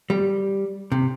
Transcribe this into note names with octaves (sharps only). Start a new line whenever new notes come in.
G3
C3